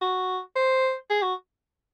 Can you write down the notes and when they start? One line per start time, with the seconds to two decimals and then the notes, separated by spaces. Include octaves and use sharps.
0.02 F#4
0.56 C5
1.10 G#4
1.22 F#4